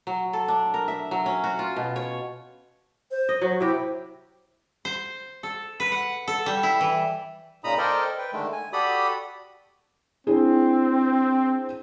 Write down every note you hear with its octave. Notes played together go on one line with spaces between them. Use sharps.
F#3
A4
D4
A#4
E5
F#3
C#4
F#4
F4
B2
C#5
C5
D#5
F#3 F#4
C3 E4 G4
C5
A4
B4
F#5
A4
G3
E4
E3
A#2 C#3 D#4 A#5 B5 D#6
A4 A#4 C5 D5 D#5 G5
B4 G5
D3 D#3 G#3 A3
G#5
F#4 G4 A4 D5 B5 D#6
C4 D4 E4 G#4